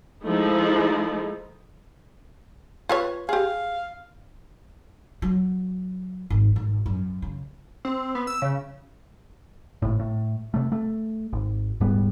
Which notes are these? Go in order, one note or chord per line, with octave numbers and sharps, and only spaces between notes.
F3 G#3 A3 D#4 E4
F4 B4 C#5
G4 G#4 F5
F#3
G#1
G#1
F#2
C#3
C4
B3
E6
C#3
G#1 A2
A2
C3 A3
A3
G#1
D#1 G#2 G3 B3